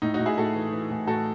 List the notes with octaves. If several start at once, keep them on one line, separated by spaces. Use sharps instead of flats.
A2 D#4
D#4 F#4
A2
E4 G#4
A2 F#4 A4
E3
E3
A2
A2 F#4 A4